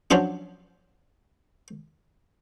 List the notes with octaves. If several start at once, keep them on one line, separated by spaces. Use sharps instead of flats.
F3 F#3 C#4 D4 F4